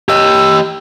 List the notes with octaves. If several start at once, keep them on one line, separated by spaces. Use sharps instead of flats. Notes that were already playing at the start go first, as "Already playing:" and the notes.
G4 D#5 E6